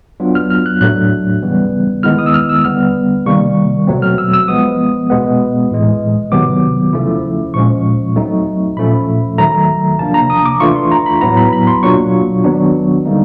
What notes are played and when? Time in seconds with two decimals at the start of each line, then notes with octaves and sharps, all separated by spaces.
0.20 F#3 B3 D4 F4
0.35 F6
0.50 F6
0.66 F#6
0.81 A2 F#3 A3 D4 F#6
1.42 C#3 E3 G3 B3
2.03 D#3 G#3 B3 E4 F6
2.19 D#6
2.26 E6
2.34 F6
2.49 E6
2.65 D3 G3 B3 F6
3.26 C3 D#3 G3 A#3 C#6
3.87 B2 F#3 A3 C4
4.02 F6
4.18 E6
4.33 E6
4.48 F3 G#3 B3 D#6
5.10 B2 G#3 B3
5.71 A2 E3 G#3
6.32 C3 D#3 F#3 B3 D6
6.93 C#3 F3 A3 C#4 E4
7.54 A#2 F3 G#3 C#4 C#6
8.16 F#3 A3 C4 D#4
8.77 A#2 F3 A3 C#4 B5
9.38 D#3 F#3 A3 A#5
9.99 C3 F3 A#3 D4 A5
10.14 A#5
10.30 D#6
10.46 D6
10.60 E3 A3 D4 F4 C#6
10.76 C6
10.91 A#5
11.06 B5
11.21 A2 F#3 B3 E4 A#5
11.37 B5
11.53 B5
11.67 C6
11.83 B2 F#3 A#3 D4 F4 C#6
12.44 D#3 F#3 B3 D4
13.06 D3 G3 A#3 D#4